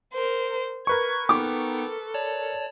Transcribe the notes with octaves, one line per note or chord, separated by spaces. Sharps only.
A#4 C5
A#4 B4 C#6 G#6
B3 D#4 A4 G5 D6
C#5 D5 A5